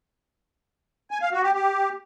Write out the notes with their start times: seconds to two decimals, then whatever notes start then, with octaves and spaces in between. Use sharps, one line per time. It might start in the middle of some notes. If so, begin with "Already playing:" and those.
1.11 G#5
1.22 F5
1.32 F#4
1.43 G4
1.54 G4